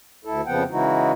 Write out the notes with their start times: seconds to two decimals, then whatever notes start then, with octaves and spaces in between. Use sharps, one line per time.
0.25 D2 E4 A4
0.46 F2 C#3 F3 B3 F#5 G5
0.71 C#3 E3 G#3 D#4 E4 F#4